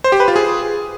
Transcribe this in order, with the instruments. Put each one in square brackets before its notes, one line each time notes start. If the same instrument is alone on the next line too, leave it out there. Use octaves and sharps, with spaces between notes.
[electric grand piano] C5
G4
B4
F4
G#4